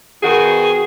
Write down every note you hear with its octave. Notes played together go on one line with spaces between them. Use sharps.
B2 D#3 F#4 G#4